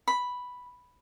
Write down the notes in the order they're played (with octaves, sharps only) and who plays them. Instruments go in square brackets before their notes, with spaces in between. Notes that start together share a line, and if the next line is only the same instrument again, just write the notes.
[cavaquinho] B5